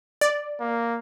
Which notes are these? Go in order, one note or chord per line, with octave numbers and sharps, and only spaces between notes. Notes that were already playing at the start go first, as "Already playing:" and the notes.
D5
A#3